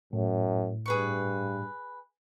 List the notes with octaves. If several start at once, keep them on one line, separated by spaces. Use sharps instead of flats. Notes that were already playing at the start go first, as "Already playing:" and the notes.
F#2 A2
G2 G#4 B4 C#6